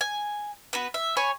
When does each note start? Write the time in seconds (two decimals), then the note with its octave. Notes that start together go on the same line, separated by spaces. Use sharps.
0.01 G#5
0.73 B3 F#4 B4
0.94 E5
1.17 C#5 G#5 B5 C#6